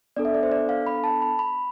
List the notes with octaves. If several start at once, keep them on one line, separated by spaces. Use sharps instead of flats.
B3 D4 A4 D5
E5
D5
C5
D5
F5
B5
A5
B5
B5